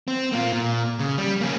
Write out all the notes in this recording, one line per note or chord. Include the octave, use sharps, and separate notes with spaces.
C4
A#3 F4
A#2
C#3
G3
A#3 C#4